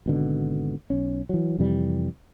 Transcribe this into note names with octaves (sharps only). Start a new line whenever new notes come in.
G#1 B2 D3
B1 C#4
E3 F#3
F2 C3 E3 G3